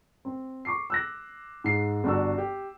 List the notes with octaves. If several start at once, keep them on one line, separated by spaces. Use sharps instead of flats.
C4
C#6 D6 C7
E6 F#6 A#6
G#2 C7
G1 D4 F#4 E6
G4